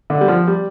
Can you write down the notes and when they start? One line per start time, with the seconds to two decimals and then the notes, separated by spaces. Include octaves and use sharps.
0.10 D3
0.21 G3
0.28 F3
0.48 G3